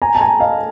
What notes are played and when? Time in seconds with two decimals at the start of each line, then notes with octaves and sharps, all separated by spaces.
0.02 G#5 A#5
0.15 A5
0.21 G#5 A#5
0.40 D#5 F5